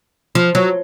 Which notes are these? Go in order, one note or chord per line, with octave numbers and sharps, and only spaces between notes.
F3
F#3